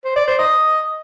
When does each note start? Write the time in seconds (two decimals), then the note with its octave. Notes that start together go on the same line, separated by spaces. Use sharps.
0.05 C5
0.16 D5
0.27 C5
0.39 D#5